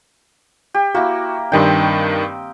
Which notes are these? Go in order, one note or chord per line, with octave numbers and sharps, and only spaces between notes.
G4
A#3 E4 F#4
G2 D#3 C4 D4 D#5 G5